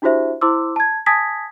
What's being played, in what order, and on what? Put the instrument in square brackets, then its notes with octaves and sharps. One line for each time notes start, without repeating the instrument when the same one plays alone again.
[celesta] D4 E4 F#4 G4 C5 E5
E4 C5 C6 D6 E6
A5 G#6
G#5 A5 D#6 G#6 A#6 B6